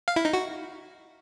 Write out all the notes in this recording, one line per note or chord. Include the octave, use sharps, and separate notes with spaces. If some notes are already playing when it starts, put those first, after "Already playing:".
F5
E4
D#4
F#4